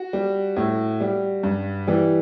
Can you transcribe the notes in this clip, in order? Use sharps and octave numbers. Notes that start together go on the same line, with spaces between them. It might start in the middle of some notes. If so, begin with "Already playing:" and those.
Already playing: F#4
G3
A2
G3
G2
E3 G3